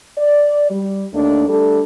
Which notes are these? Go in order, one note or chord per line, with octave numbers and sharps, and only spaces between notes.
D5
G3
D#2 A3 D4
G3 A3 D4 A4